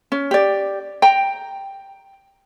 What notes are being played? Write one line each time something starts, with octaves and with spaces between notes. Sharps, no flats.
C#4
G4 D5
G5 A#5